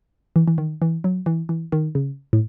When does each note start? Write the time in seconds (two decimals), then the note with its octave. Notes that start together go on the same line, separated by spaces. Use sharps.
0.36 E3
0.48 E3
0.58 D#3
0.82 E3
1.04 F#3
1.26 E3
1.49 E3
1.72 D#3
1.95 C#3
2.33 A2